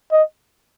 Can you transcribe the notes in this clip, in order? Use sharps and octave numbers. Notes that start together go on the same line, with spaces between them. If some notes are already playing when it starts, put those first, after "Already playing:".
D#5